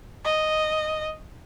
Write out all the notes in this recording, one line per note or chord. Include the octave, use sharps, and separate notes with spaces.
D#5